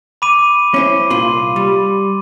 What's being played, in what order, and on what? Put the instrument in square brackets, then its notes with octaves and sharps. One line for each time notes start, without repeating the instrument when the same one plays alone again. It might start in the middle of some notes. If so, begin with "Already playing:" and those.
[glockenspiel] B5 D6 D#7
[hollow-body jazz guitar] C#4 E4 C5
[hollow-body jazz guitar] C2 A#2 F4 [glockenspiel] C6
[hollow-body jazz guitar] G3